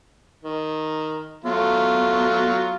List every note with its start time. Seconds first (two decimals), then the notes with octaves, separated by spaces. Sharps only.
0.43 D#3
1.44 F#3 A3 B3 F4